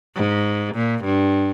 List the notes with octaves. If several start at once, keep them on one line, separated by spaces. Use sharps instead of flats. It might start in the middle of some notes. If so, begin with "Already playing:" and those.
G#2
A#2
G2